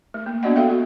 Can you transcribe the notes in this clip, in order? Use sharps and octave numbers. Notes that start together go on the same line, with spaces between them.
A3
A#3
B3 D4 F#4 D5 D#5 F#5
F#4 A4 E5 F5 G5
F#4